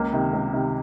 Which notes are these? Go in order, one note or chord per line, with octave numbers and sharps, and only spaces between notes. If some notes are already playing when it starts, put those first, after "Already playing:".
Already playing: C#2 A#3
C3 D#3
C#2
C3 D#3